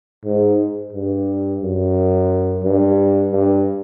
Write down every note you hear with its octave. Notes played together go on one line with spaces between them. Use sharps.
G#2
G2
F#2
G2
G2